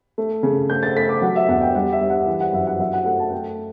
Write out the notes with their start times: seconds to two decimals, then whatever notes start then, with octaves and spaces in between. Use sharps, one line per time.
0.18 A3
0.43 C#3
0.70 A3 G6
0.83 A6
0.96 A3 B6
1.09 D6
1.22 F#3 F#5
1.36 E5
1.48 E2 F#5
1.61 G5
1.75 G3 F#5
1.92 E5
2.01 G3
2.10 F#5
2.27 E3
2.40 F#5
2.53 F#2 E5
2.67 F#5
2.79 F#3 E5
2.93 F#5
3.05 A3 F#5
3.19 A5
3.31 A3 G5